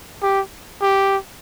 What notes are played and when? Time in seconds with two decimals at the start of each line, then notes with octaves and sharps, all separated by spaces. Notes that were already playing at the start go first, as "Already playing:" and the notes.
0.23 G4
0.81 G4